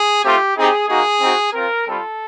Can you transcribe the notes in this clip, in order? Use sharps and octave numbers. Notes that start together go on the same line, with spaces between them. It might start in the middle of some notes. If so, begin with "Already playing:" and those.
Already playing: G#4
A3 C4 F4 G4
C4 D#4 G4 G#4
A#3 D#4 F#4 G#4
C4 D#4 F#4
C4 F4 A#4
G3 C4 F4 A4